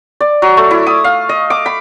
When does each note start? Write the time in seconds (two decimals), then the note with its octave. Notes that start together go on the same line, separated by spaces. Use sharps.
0.20 D5
0.42 F#3
0.57 A3
0.71 E4
0.87 D#6
1.04 F5
1.29 D#5
1.50 D6
1.66 B5